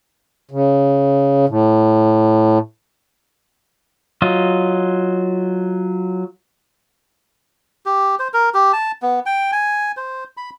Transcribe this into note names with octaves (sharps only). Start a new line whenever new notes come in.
C#3
A2
F#3 F4 D#5
G4
C5
A#4
G4
A5
B3
G5
G#5
C5
B5